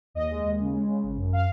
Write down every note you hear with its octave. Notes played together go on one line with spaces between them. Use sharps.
D#2 D#5
G#3
D#2
C#3
G#3
C#3
G#1
F#2
F5